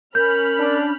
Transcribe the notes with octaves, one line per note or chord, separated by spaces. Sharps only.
C#4 A#4 B5 F6 G6
D4